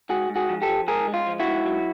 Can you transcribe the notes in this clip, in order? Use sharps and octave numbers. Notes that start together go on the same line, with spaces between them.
G#2 F#4 G#4
G#2
F#4 G#4
F3
G4 A4
F3
G#2 G#4 A#4
G#3
F4
F3
E4 F#4
G#2
F#3